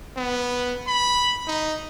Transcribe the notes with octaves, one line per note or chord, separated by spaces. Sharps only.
B3
B5
D#4